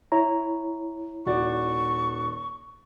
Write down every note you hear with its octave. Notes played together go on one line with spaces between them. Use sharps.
E4 C#5 A#5
D#1 F#4 D5 C#6